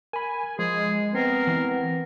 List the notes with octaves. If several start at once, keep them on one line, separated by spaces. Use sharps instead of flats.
A#4 G#5 B5
F3 G#3 G#4
B3 C4 A#4 C7
E3